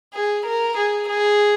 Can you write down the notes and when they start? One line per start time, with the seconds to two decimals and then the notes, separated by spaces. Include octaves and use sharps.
0.14 G#4
0.46 A#4
0.77 G#4
1.09 G#4